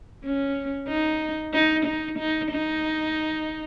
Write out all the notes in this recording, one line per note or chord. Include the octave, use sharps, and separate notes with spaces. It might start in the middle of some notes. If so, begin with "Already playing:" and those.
C#4
D#4
D#4
D#4
D#4
D#4